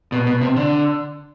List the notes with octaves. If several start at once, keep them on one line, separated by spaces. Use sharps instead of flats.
B2
B2
C3
D3